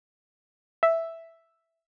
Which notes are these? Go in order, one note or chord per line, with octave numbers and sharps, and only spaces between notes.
E5